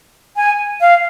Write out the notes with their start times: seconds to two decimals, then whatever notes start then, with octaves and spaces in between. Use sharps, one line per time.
0.36 G#5
0.81 F5